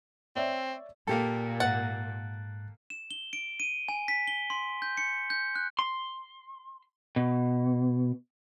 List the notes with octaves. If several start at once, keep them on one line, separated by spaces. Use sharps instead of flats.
C4 C#5 D5 E5
A#2 A#3 G4 A4
G#2 F#5 F#6 A6
E7
G7
D7
D#7
G#5
B6
G7
C6
G6
C#7
G6
F#6
C6
B2